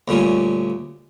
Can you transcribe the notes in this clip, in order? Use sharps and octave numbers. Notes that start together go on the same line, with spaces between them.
D2 A#2 G3 C#4